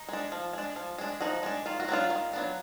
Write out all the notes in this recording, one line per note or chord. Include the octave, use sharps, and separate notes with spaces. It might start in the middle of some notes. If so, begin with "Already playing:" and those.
Already playing: D#4
G#3 D4
F3
G#3 D4
F3
G#3 D4
F3 D#4 F#4
G#3 D4
D#3 F4
F#4
F#3 B3 D4 F4
D#3
F#3 B3 D4